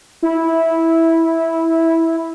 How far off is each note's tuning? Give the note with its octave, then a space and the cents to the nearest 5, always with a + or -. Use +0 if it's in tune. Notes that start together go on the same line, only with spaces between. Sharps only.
E4 -10